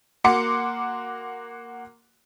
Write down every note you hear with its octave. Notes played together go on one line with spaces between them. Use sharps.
A#3 F#4 F#5 C6 D6 C#7